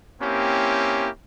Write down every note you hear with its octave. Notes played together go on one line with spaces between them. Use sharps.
A#3 C4 C#4 E4 G4